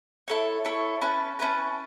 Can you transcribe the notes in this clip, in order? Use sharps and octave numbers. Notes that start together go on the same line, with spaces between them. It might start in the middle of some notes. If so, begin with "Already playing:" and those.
E4 A4 C#5
E4 A4 C#5
C#4 E4 B4 A5
C#4 E4 B4 A5